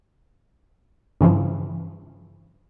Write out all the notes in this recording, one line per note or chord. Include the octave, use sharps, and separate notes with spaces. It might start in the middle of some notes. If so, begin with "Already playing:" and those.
G2 C#3 E3 F3